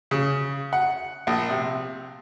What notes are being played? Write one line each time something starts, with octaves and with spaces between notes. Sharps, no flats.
C#3
F#5
A#1
C3